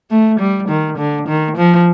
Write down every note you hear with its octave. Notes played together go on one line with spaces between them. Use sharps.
A3
G3
D#3
D3
D#3
F3